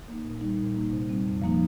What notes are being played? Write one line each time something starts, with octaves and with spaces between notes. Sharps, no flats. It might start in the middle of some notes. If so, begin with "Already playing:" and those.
A#3 D#4
A#2
G3 D#4
A#2
A#3 D#4
C3
G3 C4
F2
F3 A#3 D#4